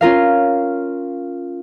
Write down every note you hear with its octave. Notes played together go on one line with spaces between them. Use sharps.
C#4 F4 A#4 F5